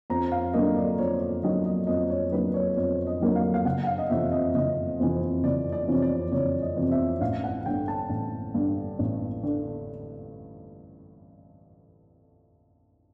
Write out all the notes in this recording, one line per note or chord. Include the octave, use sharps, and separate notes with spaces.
F2 A#5
F5
D3 F#3 A#3 D#5
D5
F2 C#5
D5
D3 F#3 A#3 D#5
D#5
F2 D#5
C#5
D3 F#3 A#3 B4
C#5
F2 C#5
D#5
D3 F#3 A#3
F5
F5
F#1 F#5
F#5
F5
D#5
F2 C3 E3 E5
D#5
F#1 D#5
F2 C3 E3
F#1 D5
D5
F2 C3 E3 C#5
D5
F#1 C#5
D#5
F2 C3 E3
E5
A1 F5
F#5
G2 D3 G5
A5
A1
G2 D3
A1
D3